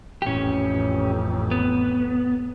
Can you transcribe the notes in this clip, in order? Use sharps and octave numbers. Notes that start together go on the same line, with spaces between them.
A1 F2 C#4 G4
B3